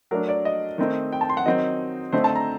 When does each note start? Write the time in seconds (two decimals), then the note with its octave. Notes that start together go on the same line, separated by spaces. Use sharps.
0.11 F#3 A3 D4 A#4
0.29 D5
0.45 D#5
0.78 D#3 A3 C4 D#4
1.13 G5
1.21 A5
1.30 C6
1.37 F#5
1.46 D#3 F#3 C4 D#4 D#5
2.13 D3 A3 C4 D#4 C5
2.24 A5
2.35 A#5